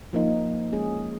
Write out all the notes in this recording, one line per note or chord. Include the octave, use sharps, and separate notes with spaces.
F3 A#3 D#4
G#3 C#4 G#4